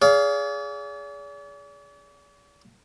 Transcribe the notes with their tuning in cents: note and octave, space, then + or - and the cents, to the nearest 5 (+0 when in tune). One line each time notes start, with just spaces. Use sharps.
G#4 +0 D5 -45 F5 +0